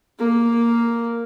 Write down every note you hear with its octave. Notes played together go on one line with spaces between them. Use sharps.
A#3